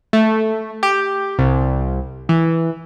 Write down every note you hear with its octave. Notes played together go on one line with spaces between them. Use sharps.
A3
G4
C2
E3